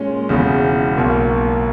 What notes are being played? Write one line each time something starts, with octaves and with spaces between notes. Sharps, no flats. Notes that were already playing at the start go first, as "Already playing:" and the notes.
Already playing: A#2 G#3 C#4
E1 E2 C#3
B1 B2 A#3